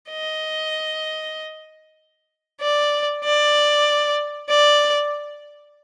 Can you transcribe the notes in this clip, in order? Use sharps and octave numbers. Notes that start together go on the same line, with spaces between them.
D#5
D5
D5
D5